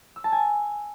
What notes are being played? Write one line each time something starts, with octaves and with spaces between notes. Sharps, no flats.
E6
A5
G#5